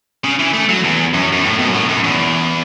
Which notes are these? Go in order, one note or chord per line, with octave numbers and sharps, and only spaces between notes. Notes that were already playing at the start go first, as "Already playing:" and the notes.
C#3
E3
A3
F#3
E2
F#2
F#2
A2
B2
F#2
A2
F#2
E2